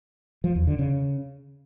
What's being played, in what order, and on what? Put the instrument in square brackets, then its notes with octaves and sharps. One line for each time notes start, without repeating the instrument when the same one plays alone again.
[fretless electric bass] F3
E2
D3
C#3